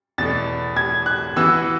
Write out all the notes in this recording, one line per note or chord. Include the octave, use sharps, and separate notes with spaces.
E2 B2 A3 A6
G#6
F#6
E3 B3 F#4 E6